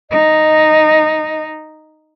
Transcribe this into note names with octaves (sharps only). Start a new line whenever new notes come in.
D#4 D#5